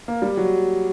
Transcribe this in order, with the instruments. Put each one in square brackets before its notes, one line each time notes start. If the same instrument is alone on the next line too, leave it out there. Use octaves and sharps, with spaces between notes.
[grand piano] A#3
G3
F#3